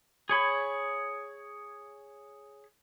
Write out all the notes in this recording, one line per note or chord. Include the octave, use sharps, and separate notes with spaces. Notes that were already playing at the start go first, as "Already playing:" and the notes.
G#4 C#5 B5